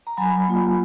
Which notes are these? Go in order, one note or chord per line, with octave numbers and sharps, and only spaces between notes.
A#5
F#3 G#5 B5
A#3 F4